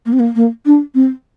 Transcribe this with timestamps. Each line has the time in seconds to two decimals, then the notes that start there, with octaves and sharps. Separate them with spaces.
0.06 A#3
0.13 C4
0.20 A#3
0.36 A#3
0.66 D4
0.95 C4